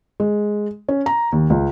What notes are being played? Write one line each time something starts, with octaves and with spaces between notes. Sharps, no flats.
G#3
C#4
A#5
D#2
C#2